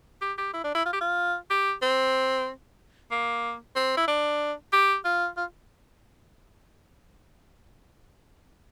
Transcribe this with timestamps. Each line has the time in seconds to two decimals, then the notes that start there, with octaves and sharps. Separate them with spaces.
0.22 G4
0.38 G4
0.53 E4
0.64 D4
0.75 E4
0.86 F4
0.93 G4
1.01 F4
1.50 G4
1.82 C4
3.11 A#3
3.76 C4
3.97 E4
4.08 D4
4.73 G4
5.05 F4
5.37 F4